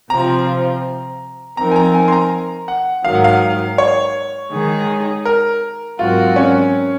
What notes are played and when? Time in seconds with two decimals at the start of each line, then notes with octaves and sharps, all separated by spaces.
0.10 C3 F3 C4 F4 A#5
1.57 F3 C4 D#4 A#4 A#5
1.71 G#5
1.76 A#5
1.94 G#5
2.08 C6
2.12 A#5
2.68 F#5
3.05 G#2 D#3 F#3 F5
3.15 F#5
3.24 F5
3.78 C#5
4.52 D#3 G#3 D#4 G#4
5.25 A#4
5.99 G#2 F#3 C4 F4 F#4 A#4
6.36 C#4